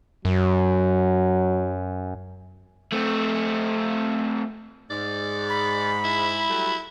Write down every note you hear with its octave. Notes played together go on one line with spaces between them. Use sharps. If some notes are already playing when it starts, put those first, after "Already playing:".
F#2 F#3
A3 C4
G#2 D5
B5
E4
F#3 G3 A3